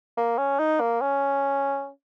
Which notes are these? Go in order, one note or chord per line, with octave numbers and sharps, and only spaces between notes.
A#3
C#4
D#4
A#3
C#4